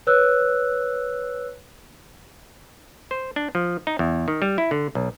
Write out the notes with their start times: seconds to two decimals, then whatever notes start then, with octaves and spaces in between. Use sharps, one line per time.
0.07 B4 C#5 E6 F#6
3.11 C5
3.36 D4
3.55 F3
3.87 D#4
3.99 E2
4.28 D#3
4.42 G3
4.58 E4
4.71 D3
4.95 B1